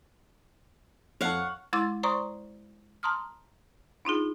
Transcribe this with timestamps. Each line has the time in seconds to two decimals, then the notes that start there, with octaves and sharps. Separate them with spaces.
1.21 F2 A4 C#5 F5 F#5
1.73 G#3 E4 C6 D6 E6 A6
2.03 C5 D5 A#5 C6 C#6 D#6
3.03 A5 A#5 C6 D#6 F6
4.05 D4 D#4 F4 G#4